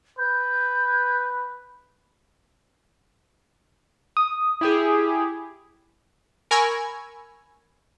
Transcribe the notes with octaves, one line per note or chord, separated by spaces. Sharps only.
B4 G6
D#6
E4 G4 G#4
A#4 G#5 B5 C#6 E6 G#6